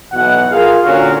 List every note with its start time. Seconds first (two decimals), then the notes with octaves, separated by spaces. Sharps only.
0.13 B1 B2 E3 F#5
0.52 F4 G#4 A#4 F5
0.84 A#2 D3 C#4 F#4 A#4 F5